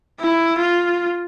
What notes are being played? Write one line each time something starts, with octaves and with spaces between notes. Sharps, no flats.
E4
F4